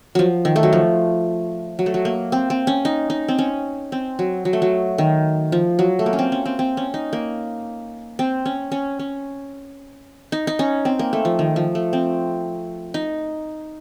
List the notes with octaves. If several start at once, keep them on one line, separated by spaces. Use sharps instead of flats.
F3 F#3
D#3
A3
F#3
F3
F#3
A3
F#3
A#3
C4
C4
C#4
D#4
D#4
C4
C#4
C4
F#3
F#3
A3
F#3
D#3
F3
F#3
A3
A#3
C#4
C4
C#4
C4
C4
C#4
D#4
A#3
C4
C#4
C#4
C#4
D#4
D#4
C#4
C4
A#3
A3
F3
D#3
F3
A3
C4
D#4